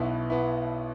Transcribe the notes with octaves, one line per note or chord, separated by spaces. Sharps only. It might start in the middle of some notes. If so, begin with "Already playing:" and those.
Already playing: B1 B2 B3 E4
B3 E4